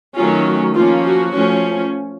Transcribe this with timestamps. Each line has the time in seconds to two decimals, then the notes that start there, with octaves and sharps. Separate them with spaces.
0.16 D#3 F#3 A3 C#4 F4
0.75 F3 A#3 C#4 F4
1.05 F#4
1.34 F3 A3 C#4